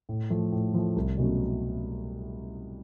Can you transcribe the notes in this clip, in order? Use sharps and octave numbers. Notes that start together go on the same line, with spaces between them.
A2
F3 A3
A2
F3 A3
C2
B2 F#3 A3 C#4